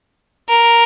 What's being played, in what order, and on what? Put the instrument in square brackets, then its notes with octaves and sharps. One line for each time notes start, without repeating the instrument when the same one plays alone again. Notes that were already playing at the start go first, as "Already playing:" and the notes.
[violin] A#4